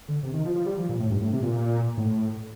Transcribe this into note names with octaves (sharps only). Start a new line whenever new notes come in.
D3
C3
D#3
F3
F3
G3
F3
A#2
A2
G2
A2
C3
A#2
A2